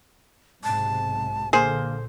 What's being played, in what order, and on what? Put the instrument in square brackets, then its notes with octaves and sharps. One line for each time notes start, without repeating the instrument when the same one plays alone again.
[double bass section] B1 G#2 C3 [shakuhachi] A5
[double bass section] A#2 D3 [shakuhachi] A#3 [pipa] G#4 C5